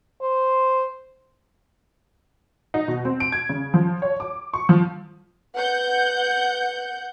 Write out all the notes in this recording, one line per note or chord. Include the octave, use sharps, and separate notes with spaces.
C5
D#4
B2
C4
D7
G#6
C#3
F3
C#5
D6
C#6
F3
B4 F#5 G6